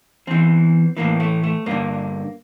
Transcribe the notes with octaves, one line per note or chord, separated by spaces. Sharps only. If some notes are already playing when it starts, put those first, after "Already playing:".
E2 E3 C4
A2 E3 A#3
A3
A3
G2 D3 A#3